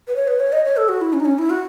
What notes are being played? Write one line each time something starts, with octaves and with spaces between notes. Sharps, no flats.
B4
C#5
B4
C#5
D#5
C#5
A4
F#4
E4
C#4
D#4
C#4
E4
F#4